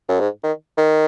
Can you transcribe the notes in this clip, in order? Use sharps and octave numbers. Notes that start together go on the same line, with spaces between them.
F#2
G#2
D#3
D#3